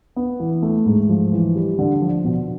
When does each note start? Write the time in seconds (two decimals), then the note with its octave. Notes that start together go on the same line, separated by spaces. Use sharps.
0.16 B3
0.40 E3
0.62 A3
0.86 G#2
1.09 F3
1.32 E3
1.56 G3
1.79 D3
2.02 F3
2.24 B2